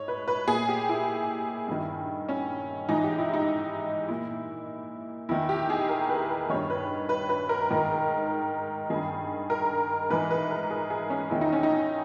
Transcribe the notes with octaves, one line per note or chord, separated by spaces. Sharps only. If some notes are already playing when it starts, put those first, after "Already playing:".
Already playing: G#2 C#5
B4
B4
A#2 G#4
G4
E4
G2 D#3
C#4
G#2 E3 D#4
G4
E4
D#4
A#2 E4
E2 D#3 E4
G4
G#4
A#4
B4
B4
G2 D#3 C#5
B4
B4
B4
A#4
G#2 D#3
G2 D#3 G#4
A#4
G#2 E3 B4
B4
A#4
G#4
G#4
C#4
E2 D#3 E4
D#4
C#4
D#4